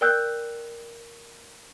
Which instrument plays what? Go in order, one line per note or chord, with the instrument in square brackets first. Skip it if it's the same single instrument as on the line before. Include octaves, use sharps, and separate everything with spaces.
[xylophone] A#4 D5 G5 E6 F#6 G6